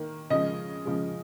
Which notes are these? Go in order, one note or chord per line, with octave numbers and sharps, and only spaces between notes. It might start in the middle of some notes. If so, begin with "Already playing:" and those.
Already playing: D#3 A#3
C#3 F3 G#3 D#5
C#3 F3 G#3